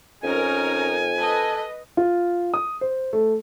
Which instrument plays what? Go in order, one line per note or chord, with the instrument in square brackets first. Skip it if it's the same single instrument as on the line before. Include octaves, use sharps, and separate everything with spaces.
[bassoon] F2 [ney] C#4 [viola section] D#4 A#4 [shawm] G#5
[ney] A4 [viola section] B4 D#5
[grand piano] F4
D#6
C5
A3